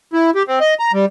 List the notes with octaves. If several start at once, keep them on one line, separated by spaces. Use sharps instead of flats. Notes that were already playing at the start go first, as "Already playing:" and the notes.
E4
G4
C4
D#5
A#5
G3